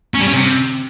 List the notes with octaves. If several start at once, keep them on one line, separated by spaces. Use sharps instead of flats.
C#4
G3
C#4
C3